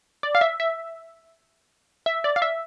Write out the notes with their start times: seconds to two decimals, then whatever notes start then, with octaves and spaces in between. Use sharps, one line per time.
0.23 D5
0.35 F5
0.41 E5
0.60 E5
2.06 E5
2.24 D5
2.36 F5
2.42 E5